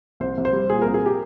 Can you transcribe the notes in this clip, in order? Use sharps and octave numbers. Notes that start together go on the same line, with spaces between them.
C2 C5
C2
C5
G3
A#2 G#4
C2 A#4
G#4
G4